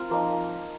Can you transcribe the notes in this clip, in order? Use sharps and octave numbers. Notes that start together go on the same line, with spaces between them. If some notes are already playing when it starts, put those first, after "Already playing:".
Already playing: C4 F4 A#4
F3 A#3 D#4